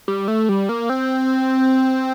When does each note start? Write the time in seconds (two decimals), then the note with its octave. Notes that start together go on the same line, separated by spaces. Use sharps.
0.08 G3
0.28 A3
0.49 G3
0.69 A#3
0.90 C4